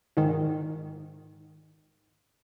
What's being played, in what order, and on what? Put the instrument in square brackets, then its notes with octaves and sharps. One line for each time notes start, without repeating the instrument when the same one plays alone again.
[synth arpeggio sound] G#2 D#3